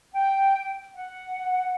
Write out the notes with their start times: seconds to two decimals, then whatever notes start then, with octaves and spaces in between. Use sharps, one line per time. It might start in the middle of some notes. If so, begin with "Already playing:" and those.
0.13 G5
0.94 F#5